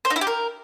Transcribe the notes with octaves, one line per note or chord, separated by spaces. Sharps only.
C5
D#4
E4
G4
A#4